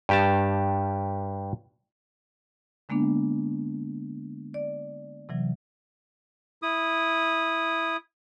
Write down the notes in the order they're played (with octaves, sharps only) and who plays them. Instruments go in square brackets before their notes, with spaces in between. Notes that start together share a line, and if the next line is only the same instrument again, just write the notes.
[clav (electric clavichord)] G2 G4 A5
[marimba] D3 G#3 A#3 B3 D4
D5
C3 E3 F#3
[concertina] E4 D#6